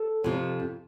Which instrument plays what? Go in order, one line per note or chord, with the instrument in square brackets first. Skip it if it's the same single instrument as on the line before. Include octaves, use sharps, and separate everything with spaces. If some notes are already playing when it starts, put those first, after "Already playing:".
Already playing: [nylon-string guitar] A4
F2 C3 F3